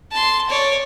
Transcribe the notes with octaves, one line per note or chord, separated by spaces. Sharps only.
A5 C6
C#5 D5